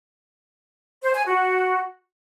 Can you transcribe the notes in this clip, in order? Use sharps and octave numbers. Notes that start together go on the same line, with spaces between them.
C5
G#5
F#4